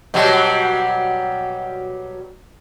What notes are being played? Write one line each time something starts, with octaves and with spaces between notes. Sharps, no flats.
B2 F#3 G3